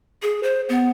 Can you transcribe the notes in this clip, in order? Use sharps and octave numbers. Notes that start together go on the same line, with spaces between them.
G#4
C5
B3